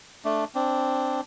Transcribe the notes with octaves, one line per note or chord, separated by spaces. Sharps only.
A3 D4
C4 D4